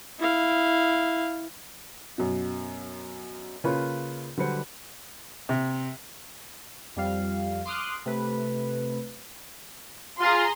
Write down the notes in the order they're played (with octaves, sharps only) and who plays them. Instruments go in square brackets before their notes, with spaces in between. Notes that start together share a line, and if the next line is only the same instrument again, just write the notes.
[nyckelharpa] E4 F5
[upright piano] F#2 B2
C#3 A#3 F4 B4 C#5
D3 F#3 G3 B4 C5 C#7
[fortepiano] C3
[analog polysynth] F2 G3 F5
C6 D6 D#6 F6 F#6
C3 A3 B4
[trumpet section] F4 [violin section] G#4 A#5 C6